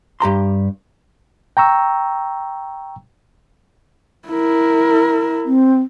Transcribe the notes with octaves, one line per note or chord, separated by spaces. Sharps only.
G2 G4 A#5 C6
G5 A#5 C#6 E6
E4 A#4
C4